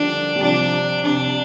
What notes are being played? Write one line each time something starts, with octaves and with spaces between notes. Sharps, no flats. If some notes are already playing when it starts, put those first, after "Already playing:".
Already playing: D3 F3 G3 A#3 D4
G3
C3 F3 D4
C3 D4
C3